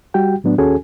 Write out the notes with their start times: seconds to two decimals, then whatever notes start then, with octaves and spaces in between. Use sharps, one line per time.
0.14 G3 F#4 G4 G5
0.44 A2 F#3 B3 D4
0.58 D#2 C#4 F#4 G#4 A4 G#5